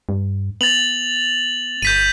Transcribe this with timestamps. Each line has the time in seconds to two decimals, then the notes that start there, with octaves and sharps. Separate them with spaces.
0.09 G2
0.61 B3 A6 F7 F#7
1.82 G1 G6 B6 D#7